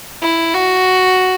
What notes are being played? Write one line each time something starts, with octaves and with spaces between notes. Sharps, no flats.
E4
F#4